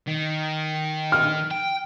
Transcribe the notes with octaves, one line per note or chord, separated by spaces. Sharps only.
D#3
F6
G5